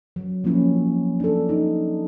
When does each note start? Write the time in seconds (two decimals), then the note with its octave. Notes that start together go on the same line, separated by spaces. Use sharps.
0.16 F#3
0.44 F3 A#3 C4 C#4 E4
1.20 D4 A4
1.49 D#4